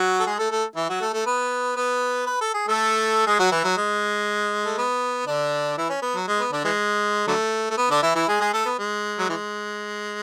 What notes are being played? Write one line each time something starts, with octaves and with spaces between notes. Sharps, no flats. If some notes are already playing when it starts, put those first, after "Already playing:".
Already playing: F#3 F#4
A4
G#3 G#4
A3 A4
A3 A4
E3 E4
F#3 F#4
A3 A4
A3 A4
B3 B4
B3 B4
B4
A4
G#4
A3 A4
G#3 G#4
F#3 F#4
E3 E4
F#3
G#3
A3
B3
D3 D4
E3 E4
C#4
B3
F#3
G#3
B3
D3 D4
E3 G#3
D3 F#3 A3
A3
B3
D3 D4
E3 E4
E3 E4
G#3 G#4
G#3 G#4
A3 A4
B3
G#3
F#3
E3 G#3